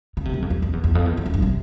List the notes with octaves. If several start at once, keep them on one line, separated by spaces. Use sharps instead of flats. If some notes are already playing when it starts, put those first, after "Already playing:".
C#3
C3
F#2
F2
E2
F2
E2
E2
F2
E2
F2
F#2
G2
C3